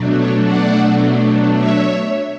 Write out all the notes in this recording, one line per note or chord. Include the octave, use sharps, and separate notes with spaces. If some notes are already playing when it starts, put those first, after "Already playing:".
Already playing: B2 F#3 A3 D4
C#5
D5 F#5
C#5 E5